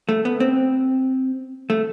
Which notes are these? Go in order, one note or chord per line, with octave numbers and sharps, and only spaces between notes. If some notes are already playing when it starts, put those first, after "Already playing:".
A3
B3
C4
A3